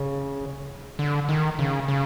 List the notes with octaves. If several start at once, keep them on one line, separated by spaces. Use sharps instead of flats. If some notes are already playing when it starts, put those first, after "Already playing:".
Already playing: C#3
D3
D#3
C#3
C#3